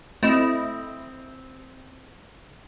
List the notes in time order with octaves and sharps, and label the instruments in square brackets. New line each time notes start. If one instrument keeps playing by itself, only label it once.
[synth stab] A3 E4 D#5 [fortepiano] C4